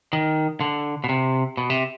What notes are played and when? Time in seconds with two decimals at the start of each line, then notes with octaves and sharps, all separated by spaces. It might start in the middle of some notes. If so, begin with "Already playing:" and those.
0.13 D#3
0.61 D3
1.04 B2
1.09 C3
1.57 B2
1.70 C3